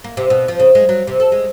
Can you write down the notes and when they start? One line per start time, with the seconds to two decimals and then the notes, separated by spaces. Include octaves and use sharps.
0.04 A#3
0.17 C3
0.30 B2
0.48 F3
0.60 C#3
0.75 G#3
0.89 F#3
1.07 C3
1.20 A4
1.32 G#3